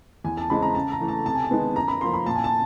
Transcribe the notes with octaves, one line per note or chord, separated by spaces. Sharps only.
E2 G#5
A5
C#3 E3 G#3 C4 B5
A#5
C#3 A5
A#5
E3 A3
A5
C3 A5
G#5
A5
D#3 G#3 B3
F#2 A#5
B5
C#3 F3 A#3 C6
B5
A#2 A5
G#5
A5